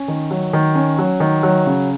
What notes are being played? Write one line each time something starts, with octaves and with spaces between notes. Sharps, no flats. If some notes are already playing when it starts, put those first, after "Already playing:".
Already playing: C#4
D#3
F#3
D#3
C#4
F#3
D#3
F#3
C#3